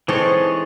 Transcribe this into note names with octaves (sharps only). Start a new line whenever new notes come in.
E3 G#3 C4 D#4 A4 C#5